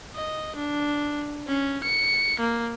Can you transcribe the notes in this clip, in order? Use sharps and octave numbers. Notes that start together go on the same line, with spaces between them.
D#5
D4
C#4
C#7
A#3